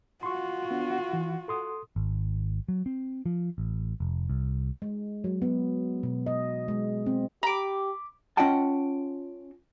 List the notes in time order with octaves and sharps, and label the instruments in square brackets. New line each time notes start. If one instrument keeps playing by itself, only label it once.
[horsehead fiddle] F4 F#4 [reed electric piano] C6 C#6
[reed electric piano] B3 D4
E3
A4 C6 D#6
[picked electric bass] G#1
F#3
C4
F3
A1
F1
C2
[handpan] G#3
F#3
B3
B2
D#5
G#3
C4
[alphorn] G4 [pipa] A#5 [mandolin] B5 D6
[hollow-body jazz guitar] C#4 F4 D#5 F#5 G5 A5